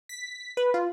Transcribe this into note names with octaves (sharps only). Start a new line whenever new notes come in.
B6
B4
F4